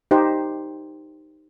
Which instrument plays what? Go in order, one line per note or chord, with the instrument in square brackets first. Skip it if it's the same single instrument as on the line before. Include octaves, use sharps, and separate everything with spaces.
[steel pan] D#4 G4 C5